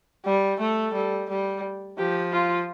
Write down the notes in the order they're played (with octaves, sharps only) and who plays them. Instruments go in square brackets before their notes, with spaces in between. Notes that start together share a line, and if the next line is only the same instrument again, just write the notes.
[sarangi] G3
[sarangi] A3 [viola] A4
[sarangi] G3
G3
[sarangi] F3 [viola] G4
[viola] F4